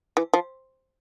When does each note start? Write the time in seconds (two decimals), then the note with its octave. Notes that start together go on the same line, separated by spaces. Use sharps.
0.17 E3
0.34 F3